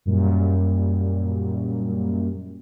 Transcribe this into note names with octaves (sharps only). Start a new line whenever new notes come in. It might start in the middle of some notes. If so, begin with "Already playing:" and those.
F#2 A#2 G3